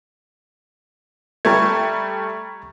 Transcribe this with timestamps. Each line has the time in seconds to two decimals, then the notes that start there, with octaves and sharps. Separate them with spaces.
1.45 G3 A3 A#5 C#6 G#6